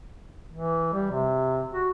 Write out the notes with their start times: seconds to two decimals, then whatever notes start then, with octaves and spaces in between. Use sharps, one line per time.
0.53 E3
0.93 G3
1.11 C3
1.71 F#4